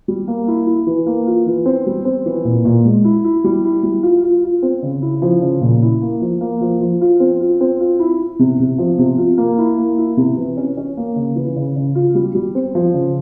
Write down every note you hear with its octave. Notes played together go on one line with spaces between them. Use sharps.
G3
A#3
E4
E4
E3
A#3
F4
E3
C4
G3
C4
E3
A#2
A#2
G#3
E4
E4
G3
E4
G3
F4
F4
F4
C4
C#3
E4
F3
C#3
A#2
E4
A#3
F3
A#3
F3
F3
F4
C4
F4
C4
F4
E4
E4
C3
C3
F3
C3
F4
A#3
E4
A#3
E4
C3
E3
C#4
C#4
A#3
C#3
E3
C#3
C#3
F4
G3
G3
C4
F3
C#3